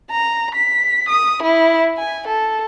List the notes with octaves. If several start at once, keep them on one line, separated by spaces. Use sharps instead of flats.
A#5
B6
D#6
E4
G#5
A4